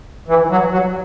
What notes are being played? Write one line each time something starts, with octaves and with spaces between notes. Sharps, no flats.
E3
F#3
F#3